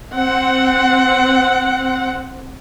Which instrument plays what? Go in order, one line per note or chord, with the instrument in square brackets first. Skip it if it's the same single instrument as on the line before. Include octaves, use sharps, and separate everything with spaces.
[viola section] C4 F#5